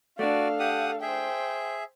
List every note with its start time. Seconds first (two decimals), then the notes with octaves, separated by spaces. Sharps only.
0.19 A3 D4 F#4 A4 D5 F5
0.59 G4 F#5 D#6
1.02 G#4 C5 E5 G5